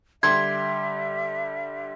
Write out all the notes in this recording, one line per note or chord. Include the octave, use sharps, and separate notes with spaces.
D3 G3 G4 E5 C6 G#6